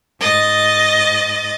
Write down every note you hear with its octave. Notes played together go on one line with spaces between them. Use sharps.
G#2 D#5 A6